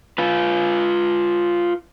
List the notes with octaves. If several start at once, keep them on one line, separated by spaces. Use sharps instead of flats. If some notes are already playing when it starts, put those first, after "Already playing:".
F4 B4